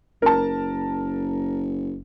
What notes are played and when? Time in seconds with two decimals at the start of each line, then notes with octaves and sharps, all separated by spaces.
0.22 F#1 A#4 A5